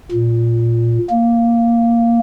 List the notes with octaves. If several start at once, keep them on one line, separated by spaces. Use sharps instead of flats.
A#2
A#3